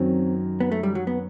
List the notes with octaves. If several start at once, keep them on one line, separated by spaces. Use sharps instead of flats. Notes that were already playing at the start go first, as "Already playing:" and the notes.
Already playing: F#2 D#3 F#3 C4
B3
A3
G3
F#3
B3